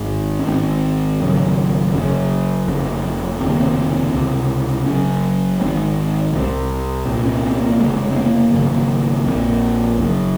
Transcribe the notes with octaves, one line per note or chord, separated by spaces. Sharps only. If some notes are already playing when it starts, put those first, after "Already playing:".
Already playing: G#1 G#2
C#4
G#1 G#2 C4
G#1 F#2 C#3
F#1 F#2 C#3 C#4
F#1 F2 C#3
F1 D#2 C#3 C4
A#3
C4
C#2 C3
F#1 F#2 C#3 C#4
G#1 G#2 C4
C2 C3
C2 A#2 C4
C#4
C4
A#3
F1 D#2 C#3 G#3
C4
A#3
G#1 F#2 C#3 A#3
A#1 A#2 C4
F#1 F#2 C#3